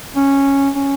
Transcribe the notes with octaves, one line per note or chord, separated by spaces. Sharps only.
C#4
C#4